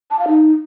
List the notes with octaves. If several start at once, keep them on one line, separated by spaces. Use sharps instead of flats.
A5
F5
D#4